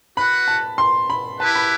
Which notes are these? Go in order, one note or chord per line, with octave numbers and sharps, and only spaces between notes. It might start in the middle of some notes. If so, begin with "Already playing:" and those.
F#4 B4 F#5 B5
A5
C6
B5
E4 G4 B4 A5
B5